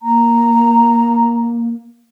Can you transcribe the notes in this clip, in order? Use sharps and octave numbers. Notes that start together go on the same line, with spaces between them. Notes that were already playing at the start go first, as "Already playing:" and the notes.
A#3 A#5